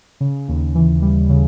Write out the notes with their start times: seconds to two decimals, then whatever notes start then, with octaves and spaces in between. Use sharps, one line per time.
0.20 C#3
0.48 D#2
0.75 E3
1.02 G3
1.30 C#3